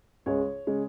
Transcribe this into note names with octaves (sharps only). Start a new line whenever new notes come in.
C#2 C#3 G#3 C#5
C#3 G#3